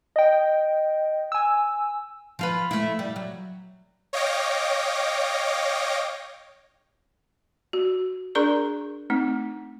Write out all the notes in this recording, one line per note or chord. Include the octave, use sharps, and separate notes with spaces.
D#5 G5
G#5 E6
F3 F4 B4
A3 E4
G3
F#3
C#5 D#5 F5 G5 D6 A#6
F#4
D4 G#4 A#4 D5 A#5 C#6
A3 C4 D#4